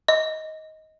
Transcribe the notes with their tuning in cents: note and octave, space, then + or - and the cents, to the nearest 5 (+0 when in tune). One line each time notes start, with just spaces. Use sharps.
D#5 +15